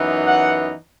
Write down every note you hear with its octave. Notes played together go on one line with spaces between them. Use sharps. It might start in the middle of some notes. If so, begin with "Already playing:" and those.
Already playing: F#2 E3 B3 D#4
F#5